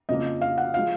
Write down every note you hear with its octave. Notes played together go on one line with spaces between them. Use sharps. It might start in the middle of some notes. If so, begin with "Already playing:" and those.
F2 C#3 F3 A#3 D#5
F5
F#5
F3 G#3 F5